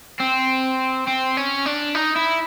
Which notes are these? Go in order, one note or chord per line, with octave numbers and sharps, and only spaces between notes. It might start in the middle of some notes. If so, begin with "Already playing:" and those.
C4
C4
C#4
D4
D#4
E4